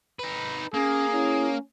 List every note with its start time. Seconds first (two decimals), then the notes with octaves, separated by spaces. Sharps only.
0.19 D#4 B4
0.74 A#3 C#4 G#4
1.13 C#4 E4